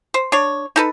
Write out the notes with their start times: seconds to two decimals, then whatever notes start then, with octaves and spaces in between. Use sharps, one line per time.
0.14 C5
0.32 D4 C#5
0.76 D#4 A4 B4